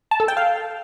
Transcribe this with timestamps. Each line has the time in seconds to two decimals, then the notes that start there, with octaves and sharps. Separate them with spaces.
0.11 A5
0.20 A4
0.28 G5
0.37 F5